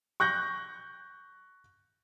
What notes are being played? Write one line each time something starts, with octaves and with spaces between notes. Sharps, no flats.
C#6 F#6 G6 A#6